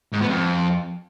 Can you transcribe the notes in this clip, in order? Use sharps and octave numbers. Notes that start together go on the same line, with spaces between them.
G#2
B3
F2